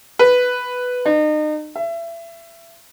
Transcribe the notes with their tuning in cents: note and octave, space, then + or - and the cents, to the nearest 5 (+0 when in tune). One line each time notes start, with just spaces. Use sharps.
B4 +5
D#4 -35
E5 +30